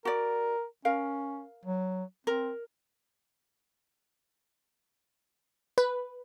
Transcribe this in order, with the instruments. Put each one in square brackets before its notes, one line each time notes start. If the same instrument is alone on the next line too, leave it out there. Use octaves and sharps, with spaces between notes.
[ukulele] F#4 D5 [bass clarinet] A#4
[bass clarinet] C#4 [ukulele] A#4 F5
[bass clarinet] F#3
[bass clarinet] C4 [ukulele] A#4
[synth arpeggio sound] B4